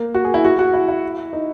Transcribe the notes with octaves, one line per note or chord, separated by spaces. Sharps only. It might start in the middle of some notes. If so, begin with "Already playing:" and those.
Already playing: A#3
F#4
G#4
E4
F#4
F#4
E4
E4
D#4